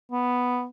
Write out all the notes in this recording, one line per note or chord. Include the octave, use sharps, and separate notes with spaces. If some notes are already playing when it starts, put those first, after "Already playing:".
B3